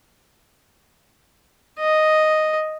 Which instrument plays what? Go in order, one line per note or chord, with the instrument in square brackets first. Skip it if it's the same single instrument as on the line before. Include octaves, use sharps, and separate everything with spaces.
[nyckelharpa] D#5